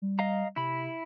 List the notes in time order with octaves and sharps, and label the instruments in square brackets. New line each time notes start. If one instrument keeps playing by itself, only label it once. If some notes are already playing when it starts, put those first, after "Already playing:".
[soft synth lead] G3
[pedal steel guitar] D#5 F5 A#5
[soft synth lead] C3 [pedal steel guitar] E4 B5